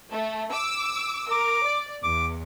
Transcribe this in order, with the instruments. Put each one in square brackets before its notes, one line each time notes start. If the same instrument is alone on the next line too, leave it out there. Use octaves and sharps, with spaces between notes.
[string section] A3
D6 E6
[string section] A#4 [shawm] D6
[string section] D5
[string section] E2 [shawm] D6